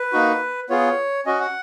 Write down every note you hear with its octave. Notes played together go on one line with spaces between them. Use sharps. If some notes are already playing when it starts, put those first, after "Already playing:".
Already playing: B4
A#3 D#4 F#4
B3 F4 G#4 C#5
C#4 F#4 D#5
F#5